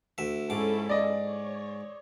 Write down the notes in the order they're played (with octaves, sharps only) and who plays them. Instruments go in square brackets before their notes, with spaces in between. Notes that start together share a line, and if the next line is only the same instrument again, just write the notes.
[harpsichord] D2 E5
[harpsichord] G#2 D6 [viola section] C#4 E4 A4
[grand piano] D5 D#5
[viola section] C#5